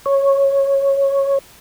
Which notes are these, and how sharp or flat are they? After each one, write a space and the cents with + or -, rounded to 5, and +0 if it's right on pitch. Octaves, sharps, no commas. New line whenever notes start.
C#5 -10